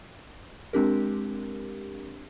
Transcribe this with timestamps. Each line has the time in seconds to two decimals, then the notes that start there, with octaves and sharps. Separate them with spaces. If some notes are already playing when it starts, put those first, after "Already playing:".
0.73 G#3 C4 D4 G4 A#4